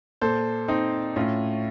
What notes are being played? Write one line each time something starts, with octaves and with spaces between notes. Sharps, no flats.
A#2 A4 C5
C4 D#4
A2 C#4 F4